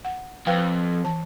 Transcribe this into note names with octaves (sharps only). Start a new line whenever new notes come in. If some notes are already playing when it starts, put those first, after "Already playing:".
F#5
F2 B4 F5 G5
E3 A5